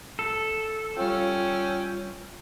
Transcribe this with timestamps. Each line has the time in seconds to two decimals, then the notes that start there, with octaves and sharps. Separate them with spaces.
0.19 A4
0.97 G3 C#4 F4 G5